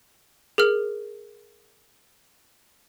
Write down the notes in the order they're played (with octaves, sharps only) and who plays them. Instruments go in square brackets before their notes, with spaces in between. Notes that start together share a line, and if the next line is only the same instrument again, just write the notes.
[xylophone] G#4 A#4 F6